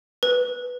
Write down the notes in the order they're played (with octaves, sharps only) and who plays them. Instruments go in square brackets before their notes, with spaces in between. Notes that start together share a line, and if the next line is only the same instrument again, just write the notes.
[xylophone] B4